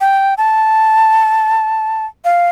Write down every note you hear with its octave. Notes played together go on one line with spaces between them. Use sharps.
G5
A5
F5